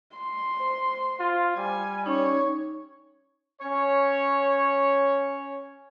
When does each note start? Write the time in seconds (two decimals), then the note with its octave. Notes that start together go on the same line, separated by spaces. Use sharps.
0.16 C6
0.60 C5
1.20 F4
1.56 G3 G#5
2.06 C#4 D#4 C#5
3.60 C#4 C#5